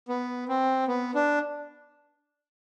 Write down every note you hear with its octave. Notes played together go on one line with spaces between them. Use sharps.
B3
C4
B3
D4